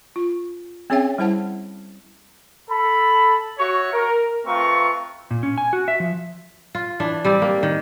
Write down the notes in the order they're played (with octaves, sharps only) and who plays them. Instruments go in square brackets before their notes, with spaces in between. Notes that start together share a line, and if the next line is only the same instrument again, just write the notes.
[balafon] F4
C4 C#4 G#4 C#5 E5 G5
G3 E4 C5 F#5 A5
[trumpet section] A4 B5
F#4 C#5 E5 C#6
A#4
A3 C4 F4 B4 A#5 C#6
[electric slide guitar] A#2
C#4
G#5
F#4
E5
F3
[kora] F4
E3 D4
G3 C4 D5
A#3
D#3